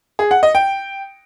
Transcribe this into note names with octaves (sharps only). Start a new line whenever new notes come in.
G#4
F#5
D#5
G5